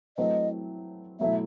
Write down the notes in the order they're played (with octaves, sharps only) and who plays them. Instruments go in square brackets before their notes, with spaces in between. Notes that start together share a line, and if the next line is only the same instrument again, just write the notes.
[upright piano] F#3 A3 C4 E4 B4 [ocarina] D#5
[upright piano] B2 F#3 A3 E4 [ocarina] E5